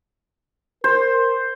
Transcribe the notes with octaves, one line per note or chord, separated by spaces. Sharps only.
A#4 C5